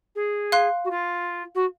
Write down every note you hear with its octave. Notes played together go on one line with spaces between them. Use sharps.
G#4
F5 C6 F#6
F#4
F4
F#4